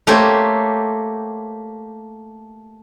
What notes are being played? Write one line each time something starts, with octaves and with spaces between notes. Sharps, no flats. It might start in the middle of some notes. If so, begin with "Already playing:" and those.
A3 A#3 G4 A4 C5 C#5